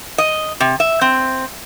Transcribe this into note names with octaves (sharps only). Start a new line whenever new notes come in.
D#5
C3
E5
C4